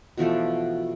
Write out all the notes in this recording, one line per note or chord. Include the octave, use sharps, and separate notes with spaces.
B2 E3 F3 A3